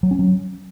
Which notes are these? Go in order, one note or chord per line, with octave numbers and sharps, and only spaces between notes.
F#3
C#4
F#3